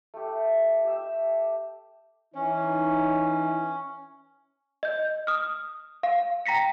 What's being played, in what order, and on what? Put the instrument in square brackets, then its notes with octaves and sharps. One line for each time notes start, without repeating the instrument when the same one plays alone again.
[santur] A3 G4
G4 E5
[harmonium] E3 [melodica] C#4 [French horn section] D#4 C#5
[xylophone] D#5 G6
D#6 F6
F5
G5 A#5 A#6 B6 C#7